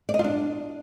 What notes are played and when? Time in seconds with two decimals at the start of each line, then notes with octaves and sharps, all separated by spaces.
0.09 D5
0.14 D#5
0.19 F4
0.24 D4